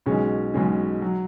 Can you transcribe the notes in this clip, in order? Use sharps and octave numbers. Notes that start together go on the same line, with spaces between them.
B1 B2 G#3 C#4 G#4
B1 B2 G#3 C#4 G#4
F#3